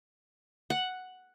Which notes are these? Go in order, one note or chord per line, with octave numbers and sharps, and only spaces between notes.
F#5